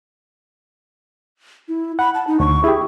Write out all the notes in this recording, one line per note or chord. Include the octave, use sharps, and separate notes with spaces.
E4
F#5 B5
A5
D#4
D2 C#6
E4 G4 G#4